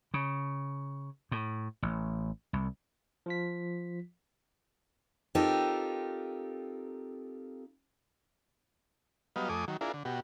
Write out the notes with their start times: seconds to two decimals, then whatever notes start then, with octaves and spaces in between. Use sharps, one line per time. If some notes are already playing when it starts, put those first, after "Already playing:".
0.14 C#3
1.32 A2
1.82 A1
2.53 C2
3.26 F3 F4 B6
5.35 C4 D#4 F4 G4 A4 A#4
9.36 F#3 G3 B3 D#5 F5
9.49 F2 A3 G#5 D6 D#6
9.68 D#3 F#3
9.81 D4 E4 F4 G#4 A#4
9.94 D3
10.05 B2 F#4 G4